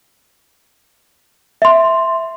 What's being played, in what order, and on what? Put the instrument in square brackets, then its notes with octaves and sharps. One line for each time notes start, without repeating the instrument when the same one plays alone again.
[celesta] E5 C6